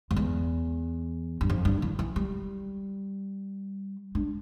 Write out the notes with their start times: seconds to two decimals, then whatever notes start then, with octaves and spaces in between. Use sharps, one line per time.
0.11 F2
0.16 E2
1.41 G2
1.50 F2
1.65 G2
1.82 E3
1.99 E3
2.16 G3
4.15 D4